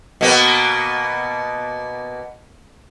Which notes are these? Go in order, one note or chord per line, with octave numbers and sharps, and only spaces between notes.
B2 A#3 B3